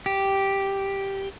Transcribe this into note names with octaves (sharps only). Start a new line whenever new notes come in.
G4